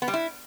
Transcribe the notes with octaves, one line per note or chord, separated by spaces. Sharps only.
B3
G3
E4